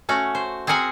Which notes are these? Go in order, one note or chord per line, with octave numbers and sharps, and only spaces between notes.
A3 C#4 F#4
C5
C4 G#4 A#4 F#5 G#5 A#5